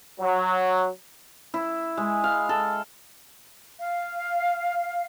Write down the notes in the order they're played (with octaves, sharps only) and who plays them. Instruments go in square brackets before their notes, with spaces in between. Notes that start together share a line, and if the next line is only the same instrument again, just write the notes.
[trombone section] F#3
[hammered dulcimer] E4
G#3
F5
A4
[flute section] F5